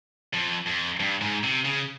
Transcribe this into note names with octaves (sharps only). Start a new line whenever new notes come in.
F2
F2
G2
G#2
C3
C#3